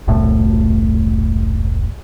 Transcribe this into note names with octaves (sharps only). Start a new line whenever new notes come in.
E1 C2 A2 A3